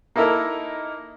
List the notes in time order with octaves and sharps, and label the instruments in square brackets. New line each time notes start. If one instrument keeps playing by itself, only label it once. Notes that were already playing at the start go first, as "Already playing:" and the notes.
[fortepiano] A#3 D#4 E4 A4 A#4